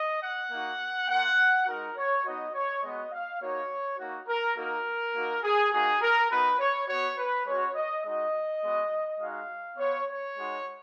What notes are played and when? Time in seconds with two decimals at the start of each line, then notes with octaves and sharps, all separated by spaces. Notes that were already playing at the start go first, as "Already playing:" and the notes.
Already playing: D#5
0.22 F#5
0.51 A#3 D#4 F#4
1.09 A#3 F4 F#5
1.67 G#3 D#4 F#4 A#4
1.96 C#5
2.25 B3 D#4 F#4 D#5
2.54 C#5
2.82 G#3 B3 F#4 D#5
3.12 F5
3.40 A#3 D#4 F#4 C#5
3.98 A#3 D#4 F#4
4.27 A#4
4.56 A#3 D#4 F#4 A#4
5.14 A#3 D#4 F#4
5.43 G#4
5.72 A#3 D#4 F#4 G#4
6.01 A#4
6.30 B3 D#4 F#4 B4
6.59 C#5
6.88 B3 F#4 C#5
7.17 B4
7.46 G#3 C#4 F#4 C#5
7.74 D#5
8.04 G#3 D#4 F#4 D#5
8.62 G#3 B3 F#4
9.19 G#3 D#4 F#4 F5
9.77 B3 F4 C#5
10.07 C#5
10.36 G#3 D#4 F#4